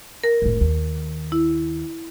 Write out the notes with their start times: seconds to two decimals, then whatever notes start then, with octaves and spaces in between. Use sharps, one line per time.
0.24 A#4
0.42 F1 A2
0.61 D#2
1.32 E4